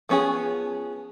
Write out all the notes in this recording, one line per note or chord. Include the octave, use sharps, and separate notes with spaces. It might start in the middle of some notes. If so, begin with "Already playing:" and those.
F3 B3 C#4 E4 G#4